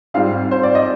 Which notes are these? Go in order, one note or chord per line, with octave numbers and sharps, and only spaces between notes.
G#2 G3 C4 F4 F5
C5
D5
D#5